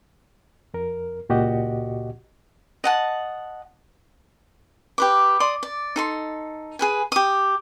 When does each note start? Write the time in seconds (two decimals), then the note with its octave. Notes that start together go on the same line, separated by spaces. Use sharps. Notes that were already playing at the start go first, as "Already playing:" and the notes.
0.74 F2 A#4
1.29 C#2 A#2 F#4 G4 D#5 F#5
2.84 D#5 F#5 A5
4.98 G4 B4 D6
5.40 D5 C6 D#6
5.63 D5
5.96 D#4 A4 C6
6.79 G#4 B4 G#5
7.12 G4 D#6